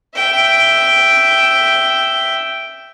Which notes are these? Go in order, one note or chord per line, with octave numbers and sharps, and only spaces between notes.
E5 G5